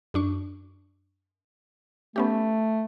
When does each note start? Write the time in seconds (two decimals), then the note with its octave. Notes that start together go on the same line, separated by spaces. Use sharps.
0.14 F#2 D4 C#6
2.16 A3 B3 C#4 G4